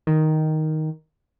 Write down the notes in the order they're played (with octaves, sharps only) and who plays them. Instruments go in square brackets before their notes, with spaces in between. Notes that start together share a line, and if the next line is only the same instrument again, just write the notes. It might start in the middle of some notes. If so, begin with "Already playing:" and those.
[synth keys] D#3